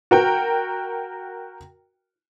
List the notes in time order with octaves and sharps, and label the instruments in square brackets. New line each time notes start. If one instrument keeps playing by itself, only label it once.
[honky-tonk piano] F#4 A#4 G5